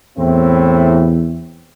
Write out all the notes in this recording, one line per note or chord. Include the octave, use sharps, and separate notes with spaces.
E2 A2 C4 E4